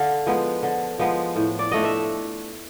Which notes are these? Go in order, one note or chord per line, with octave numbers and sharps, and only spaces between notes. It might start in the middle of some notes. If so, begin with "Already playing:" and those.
Already playing: D3 F5
F3 G#3 B3
D3
F3 G#3 B3
A2
D5
F3 A3 D4 D#5
E5